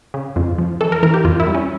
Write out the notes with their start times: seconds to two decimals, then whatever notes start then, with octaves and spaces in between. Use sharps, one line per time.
0.14 C#3
0.36 F2
0.58 F3
0.81 E3 A4
0.92 A#4
1.03 E3 A#4
1.14 G4
1.25 F2 F4
1.40 E4
1.47 G3
1.55 C#4